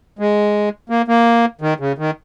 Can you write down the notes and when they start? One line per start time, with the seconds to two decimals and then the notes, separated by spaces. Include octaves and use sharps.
0.19 G#3
0.90 A#3
1.08 A#3
1.61 D#3
1.80 C#3
1.98 D#3